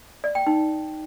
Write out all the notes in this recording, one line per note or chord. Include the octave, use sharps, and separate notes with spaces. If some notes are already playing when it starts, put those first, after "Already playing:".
D5
G5
D#4